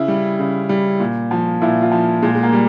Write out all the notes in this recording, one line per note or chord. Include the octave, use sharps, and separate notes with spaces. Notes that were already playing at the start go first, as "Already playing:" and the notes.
Already playing: C#3 E4
G3
C#3
G3
A#2
F3
A#2 E4
F4
F3
A#2 G#3
G#3
A#3
G3